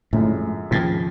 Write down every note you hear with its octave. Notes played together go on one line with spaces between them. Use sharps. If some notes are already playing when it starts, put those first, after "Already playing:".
F#2 A2 D3 F3 G#3
D#2 G#2 C#3 F3